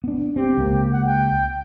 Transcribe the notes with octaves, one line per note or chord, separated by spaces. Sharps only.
B3 D4
C4 G4
C#2 A#3
F#5
G5